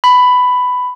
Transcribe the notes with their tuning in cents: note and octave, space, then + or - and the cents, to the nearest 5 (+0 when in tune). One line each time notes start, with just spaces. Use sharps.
B5 +10